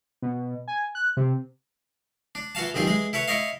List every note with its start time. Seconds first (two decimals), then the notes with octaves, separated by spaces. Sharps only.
0.22 B2
0.68 G#5
0.95 F#6
1.17 C3
2.35 D4
2.55 E3 F4 F#4 F5 A5
2.74 B1 G2 D#3 C4 F4 G#4
2.87 E3 G#3 G#4
3.13 E4 A4 B4 C#5
3.28 E4 C#5 D#5 F5